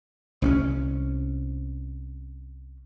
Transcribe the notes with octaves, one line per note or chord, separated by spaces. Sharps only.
C2 C4 C#4